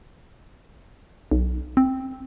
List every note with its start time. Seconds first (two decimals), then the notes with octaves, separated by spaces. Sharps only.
1.31 B1
1.77 C4